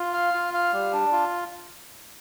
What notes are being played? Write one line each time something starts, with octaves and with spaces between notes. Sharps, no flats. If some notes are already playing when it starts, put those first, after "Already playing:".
Already playing: F4
F5
F4
F5
G3
D4
F4